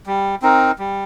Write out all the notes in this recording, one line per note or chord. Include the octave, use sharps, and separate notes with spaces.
G3
C4 D#4 A#4
G3